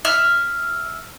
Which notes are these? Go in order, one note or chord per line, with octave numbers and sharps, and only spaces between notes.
E5 F6